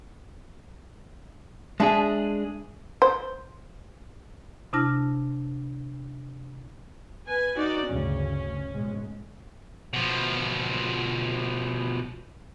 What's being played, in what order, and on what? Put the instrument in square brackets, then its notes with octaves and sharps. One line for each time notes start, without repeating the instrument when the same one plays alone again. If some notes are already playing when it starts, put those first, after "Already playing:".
[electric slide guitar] G#3 D4 G#4 [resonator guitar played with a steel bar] E5 A5
[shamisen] C5
[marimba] C3 D4 E4 A5 F6 A#6
[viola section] B4 G#5
D#4 F#4 D5
[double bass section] D2 G2 C#3 [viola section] C#4
[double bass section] G#2 B2 G#3
[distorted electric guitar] B2 F3